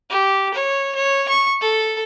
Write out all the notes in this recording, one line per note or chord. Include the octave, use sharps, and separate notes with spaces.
G4
C#5
C#5
C#6
A4